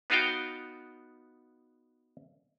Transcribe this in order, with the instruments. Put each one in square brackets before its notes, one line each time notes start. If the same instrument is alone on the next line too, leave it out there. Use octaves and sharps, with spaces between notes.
[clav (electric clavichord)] B3 D#4 F4 F#4 F5 G5